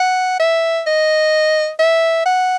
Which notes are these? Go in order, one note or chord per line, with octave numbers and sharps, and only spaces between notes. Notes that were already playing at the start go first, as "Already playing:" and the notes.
Already playing: F#5
E5
D#5
E5
F#5